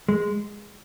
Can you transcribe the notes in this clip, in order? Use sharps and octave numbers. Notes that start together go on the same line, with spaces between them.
G#3